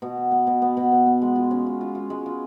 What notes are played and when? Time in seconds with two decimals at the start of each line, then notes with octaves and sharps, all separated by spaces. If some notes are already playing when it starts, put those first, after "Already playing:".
0.02 B2
0.17 B3
0.31 B3
0.47 B2
0.62 B3
0.77 B2
0.92 B2
1.06 B3
1.22 G#3
1.36 F4
1.51 C#4
1.66 F4
1.81 F4
1.95 F4
2.10 G#3
2.26 F4